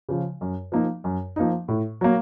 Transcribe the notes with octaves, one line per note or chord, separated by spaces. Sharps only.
C#3 F3
F#2
F3 A#3 D#4
F#2
F3 A#3 D#4
A2
F#3 A#3